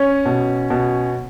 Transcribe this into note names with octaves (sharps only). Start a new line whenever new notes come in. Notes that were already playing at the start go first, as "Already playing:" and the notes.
Already playing: C#4
B2
B2